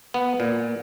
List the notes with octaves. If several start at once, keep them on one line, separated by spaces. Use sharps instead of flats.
B3
A#2